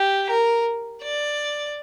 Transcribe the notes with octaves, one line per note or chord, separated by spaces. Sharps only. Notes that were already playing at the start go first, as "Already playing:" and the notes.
Already playing: G4
A#4
D5